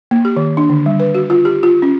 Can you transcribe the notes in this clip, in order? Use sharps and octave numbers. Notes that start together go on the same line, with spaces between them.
A#3
G4
D#3
D4
D3
G3
B4
F#4
F4
G4
F4
C#4